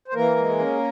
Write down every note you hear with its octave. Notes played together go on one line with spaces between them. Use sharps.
C5
E3 A#3 A#4
G#3
C#4